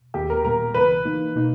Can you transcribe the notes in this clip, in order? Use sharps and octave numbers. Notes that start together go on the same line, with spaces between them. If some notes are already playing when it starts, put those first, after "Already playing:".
D#2 D#3 A#3 G4
A#4
A#2 G3 A#3 A#4
C#2 C#3 E3 B4
E3 A#3 D#4
B2 A#3 D#4